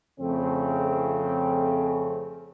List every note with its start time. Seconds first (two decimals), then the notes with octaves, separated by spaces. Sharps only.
0.20 F2 C#3 A3 C4